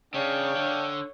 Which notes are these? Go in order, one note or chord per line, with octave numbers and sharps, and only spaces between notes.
C#3 D4 C#5 F5 G5
D3